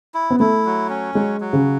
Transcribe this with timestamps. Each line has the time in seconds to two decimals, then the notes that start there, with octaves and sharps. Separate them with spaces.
0.14 E4
0.30 B3
0.40 A3 E4
0.65 F#3
0.89 C#4
1.15 F#3 G#3
1.40 F#3
1.53 C#3